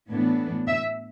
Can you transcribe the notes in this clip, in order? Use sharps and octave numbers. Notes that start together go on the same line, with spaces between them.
A2 E3 B3 D4
E5